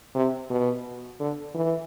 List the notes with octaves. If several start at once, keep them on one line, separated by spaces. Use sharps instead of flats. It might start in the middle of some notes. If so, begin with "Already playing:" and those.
C3
B2
D3
E3